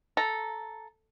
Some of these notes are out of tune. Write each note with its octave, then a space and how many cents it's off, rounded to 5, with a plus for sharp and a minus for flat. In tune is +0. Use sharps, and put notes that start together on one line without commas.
A4 -5 A#5 +0